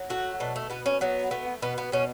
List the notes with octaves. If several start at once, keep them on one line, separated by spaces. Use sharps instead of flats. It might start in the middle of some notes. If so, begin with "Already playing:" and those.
Already playing: F#3
A3 F#4
B2 D4
A3
B2 B3
C#4
F#3 B3
A3 B3
B2 B3
B3
B2 C#4